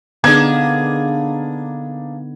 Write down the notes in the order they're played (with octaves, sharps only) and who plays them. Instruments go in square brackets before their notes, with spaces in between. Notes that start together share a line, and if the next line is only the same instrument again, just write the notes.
[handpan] D3 B3 D#4 [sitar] A#3 D4 G#4 [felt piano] G#6